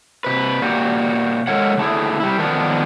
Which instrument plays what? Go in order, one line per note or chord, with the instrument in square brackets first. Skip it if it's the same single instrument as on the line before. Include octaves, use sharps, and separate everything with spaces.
[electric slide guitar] C3 B4
A#2 F#4 G4
G#3 A4 A#4 C#5 F#5
D3 A3 E4 G#4
G3 E4
D3 D#3 F3 B3 D4 A#4